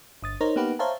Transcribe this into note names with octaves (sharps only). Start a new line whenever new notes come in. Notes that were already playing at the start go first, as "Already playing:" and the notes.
G1 D#6 A6
D#4 A#4 C5 C#5
A#3 B3 D#4 G4 B4 F#5
C5 C#5 E5 F5 A5 A#5